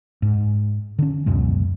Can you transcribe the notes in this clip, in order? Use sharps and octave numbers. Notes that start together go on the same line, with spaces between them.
G#2
D3 C#4
C#2 F#2 B2 G#3